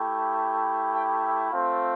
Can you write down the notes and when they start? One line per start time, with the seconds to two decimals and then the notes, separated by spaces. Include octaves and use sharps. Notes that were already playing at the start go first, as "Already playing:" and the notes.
Already playing: A3 E4 G4
0.94 G5
1.22 E5
1.51 A3 C4 F4